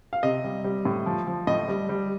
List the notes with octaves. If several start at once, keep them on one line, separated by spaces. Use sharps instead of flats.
F5
C3 D#5
G3
G3
A2
F3
F3
A2 D#5
G3
G3